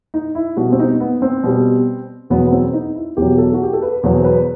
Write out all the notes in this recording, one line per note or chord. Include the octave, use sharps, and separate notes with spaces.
D#4
E4
B2 G3 F#4
C4
D#4
B3
C4
B2 G3
E2 B2 F#3 B3
B3
C4
D#4
E4
E2 B2 F#3 G4
A4
F#4
G4
A4
B4
E2 B2 F#3 B4
C5
B4